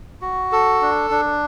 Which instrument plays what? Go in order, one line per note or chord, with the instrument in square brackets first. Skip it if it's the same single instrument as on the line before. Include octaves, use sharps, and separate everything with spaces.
[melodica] F#4
A4
D4
D4